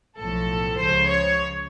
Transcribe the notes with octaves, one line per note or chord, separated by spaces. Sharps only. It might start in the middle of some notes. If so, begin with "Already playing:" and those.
B1 A2 F3 A4
C#2 C#3 F3 C5
C#5